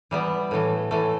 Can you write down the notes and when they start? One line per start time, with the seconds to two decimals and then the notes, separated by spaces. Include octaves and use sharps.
0.11 E3 G3 B3
0.51 A2 E3 A3
0.91 A2 E3 A3